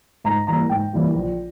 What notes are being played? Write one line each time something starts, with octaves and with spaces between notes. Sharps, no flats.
G#2 A#5
E3 G3 A#3 A#5
G#2 G5
E3 G3 A#3
A#1